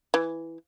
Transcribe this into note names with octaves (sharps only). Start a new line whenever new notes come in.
E3